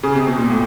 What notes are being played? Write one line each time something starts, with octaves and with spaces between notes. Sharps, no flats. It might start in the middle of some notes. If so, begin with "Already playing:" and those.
C#3
C3
B2
A#2
A2